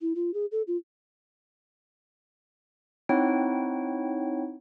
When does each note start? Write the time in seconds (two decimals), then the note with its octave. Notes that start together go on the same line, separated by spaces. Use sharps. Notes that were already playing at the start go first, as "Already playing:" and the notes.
0.01 E4
0.15 F4
0.34 G#4
0.52 A4
0.67 F4
3.09 C4 D#4 E4 C#5 F#5 G5